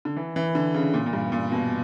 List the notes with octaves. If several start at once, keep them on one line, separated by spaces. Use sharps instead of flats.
D3
E3
E3
D3
C#3
A#2
A#2
G2
A#2
B2